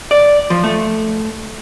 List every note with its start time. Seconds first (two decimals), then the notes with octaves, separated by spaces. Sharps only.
0.11 D5
0.50 F3
0.64 A3